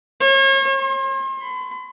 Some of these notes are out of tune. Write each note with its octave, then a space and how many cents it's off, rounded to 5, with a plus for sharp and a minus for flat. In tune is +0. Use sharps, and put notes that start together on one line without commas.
C#5 -40
C6 +35
B5 +40